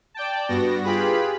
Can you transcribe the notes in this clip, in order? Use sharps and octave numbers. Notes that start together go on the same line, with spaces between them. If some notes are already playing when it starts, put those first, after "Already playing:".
D5 G5 A5
G2 B3 F#4 A#6
F4 G4 G#4 B4 B5